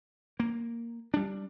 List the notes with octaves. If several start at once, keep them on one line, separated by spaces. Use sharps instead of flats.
A#3
G3 D4